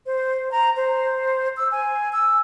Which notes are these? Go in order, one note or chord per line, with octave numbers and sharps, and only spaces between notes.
C5
A#5
C5
E6
G#5
E6